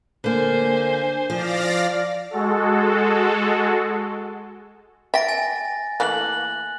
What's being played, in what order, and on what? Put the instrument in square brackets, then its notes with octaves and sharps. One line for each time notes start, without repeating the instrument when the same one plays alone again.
[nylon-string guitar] D3 A#3 [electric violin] C5 G#5
[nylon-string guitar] F3 [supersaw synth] D5 F5 A#6
[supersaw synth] G#3 F#4 A4
[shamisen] E5 G5 [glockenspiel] A6 A#6 D7
[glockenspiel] G#5 A6
[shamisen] E3 A3 A#3 [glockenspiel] F#6 F#7